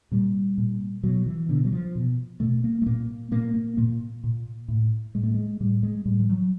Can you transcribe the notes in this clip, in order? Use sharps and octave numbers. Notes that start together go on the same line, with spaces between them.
A#2 G3
A#2
B2 F#3
E3
B2 D3
F#3
F3
B2
B2 A3
A#3
A3
A#2 A#3
A#2 A#3
A#3
A#2 A#3
A#2
A2
A2 G#3
A3
G#3
A2 G3
G#3
A2 G3
F3
F#3